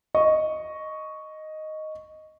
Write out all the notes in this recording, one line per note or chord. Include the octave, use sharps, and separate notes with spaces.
D#5 C#6